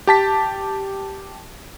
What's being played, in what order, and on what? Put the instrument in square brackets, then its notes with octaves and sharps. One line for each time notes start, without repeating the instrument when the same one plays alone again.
[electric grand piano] G4 A5 B6